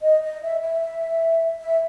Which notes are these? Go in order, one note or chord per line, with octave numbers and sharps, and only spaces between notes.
D#5
D#5
E5
E5
E5